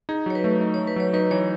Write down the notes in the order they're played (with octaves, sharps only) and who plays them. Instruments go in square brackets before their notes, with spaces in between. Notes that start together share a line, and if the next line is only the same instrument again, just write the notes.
[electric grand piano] D#4 [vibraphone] G#4
[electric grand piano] F#3 [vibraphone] C#5
[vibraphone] B4
[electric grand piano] A3
D#4
[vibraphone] C#5
[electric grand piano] F#3
[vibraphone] B4
[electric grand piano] F#3 [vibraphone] C#5
[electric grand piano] D#4 [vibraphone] B4
[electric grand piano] E3 [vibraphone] C#5